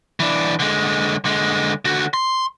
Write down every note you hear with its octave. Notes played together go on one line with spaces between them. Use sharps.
E3 D4
D3 G#3
D3 G#3
D3 F#4
C6